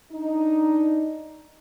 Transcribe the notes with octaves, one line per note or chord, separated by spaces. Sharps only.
D4 D#4